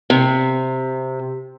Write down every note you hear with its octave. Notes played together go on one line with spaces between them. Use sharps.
C3